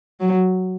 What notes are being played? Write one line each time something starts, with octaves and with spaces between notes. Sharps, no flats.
F#3